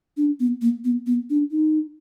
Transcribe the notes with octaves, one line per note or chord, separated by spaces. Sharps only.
D4
B3
A#3
B3
B3
D4
D#4